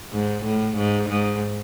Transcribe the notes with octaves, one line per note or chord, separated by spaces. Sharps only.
G#2
A2
G#2
G#2